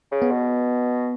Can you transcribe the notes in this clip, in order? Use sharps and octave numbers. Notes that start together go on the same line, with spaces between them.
C#3
B3
B2